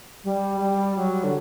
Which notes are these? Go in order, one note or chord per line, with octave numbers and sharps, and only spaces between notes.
G3
G3
F#3
D3